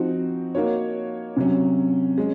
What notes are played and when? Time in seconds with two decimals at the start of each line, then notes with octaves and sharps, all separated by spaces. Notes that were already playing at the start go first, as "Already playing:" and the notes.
Already playing: F3 C4 D#4 F#4
0.55 A#3 D#4 F#4 C#5
1.37 C3 F#3 C#4
2.18 G#3 C#4